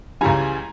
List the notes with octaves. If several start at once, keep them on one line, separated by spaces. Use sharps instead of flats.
C#2 C#3 E3 G3 G#5 A#5